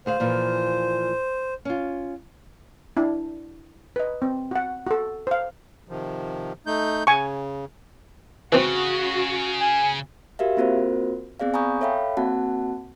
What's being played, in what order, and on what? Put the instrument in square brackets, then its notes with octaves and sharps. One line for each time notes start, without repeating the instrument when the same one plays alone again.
[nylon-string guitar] D2 G#4 F5 [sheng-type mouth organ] C5
[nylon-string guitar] A#2 E3 F3
C#4 F4
[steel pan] D4 E4
B4 D#5
C4
F#4 F#5
F#4 A4
C5 F5
[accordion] C3 D#3 F3
A3 D#4 G6
[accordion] C#3 [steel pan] G#5 C#6
[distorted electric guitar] C#3 [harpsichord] E3 C4 [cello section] F#4
[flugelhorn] G#5
[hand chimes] F#4 G4 A#4 E5 F5
A#3 C4 F4 F#4 A#4 C5
B3 C4 G#4 D5 F5
G#5 A#5 B5 C#6 D#6 G6
A4 C#5 E5 F5 G5 B5
A#3 C4 F#4 F#5 A5